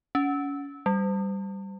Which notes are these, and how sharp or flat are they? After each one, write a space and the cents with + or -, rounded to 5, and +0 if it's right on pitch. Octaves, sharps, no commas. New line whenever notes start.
C#4 +30
G3 -5